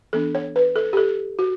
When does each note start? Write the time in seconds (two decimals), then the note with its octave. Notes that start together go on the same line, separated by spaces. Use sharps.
0.13 E3 B3 D4 A4
0.35 C#5
0.56 B4
0.76 A4
0.93 G4
0.97 A4
1.39 F#4